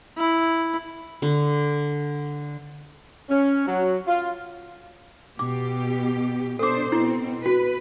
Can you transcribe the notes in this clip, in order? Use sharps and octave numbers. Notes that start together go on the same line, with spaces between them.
E4
D3
C#4
F#3
F4
B2 G4 D6
B2 D4 A4 C5 D6
B2 C4 E4
F#4 B4